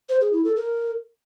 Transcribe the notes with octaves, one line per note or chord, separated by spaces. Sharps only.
C5
G#4
E4
A4
A#4